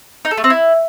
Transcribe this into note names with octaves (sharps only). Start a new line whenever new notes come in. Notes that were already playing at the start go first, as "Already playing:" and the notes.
D#4
A4
A3
C4
E4